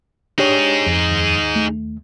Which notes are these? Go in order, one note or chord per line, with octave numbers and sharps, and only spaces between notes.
D4 D#4 G4 G#4 C#5
F2
D#2
A3